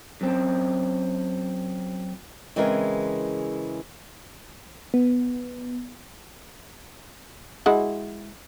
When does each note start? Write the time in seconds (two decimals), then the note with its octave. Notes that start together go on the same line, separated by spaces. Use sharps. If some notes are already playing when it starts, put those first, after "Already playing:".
0.21 F#2 C4
2.56 C#3 E3 G#3 C4 A#4
4.94 B3
7.66 G#3 E4 F#4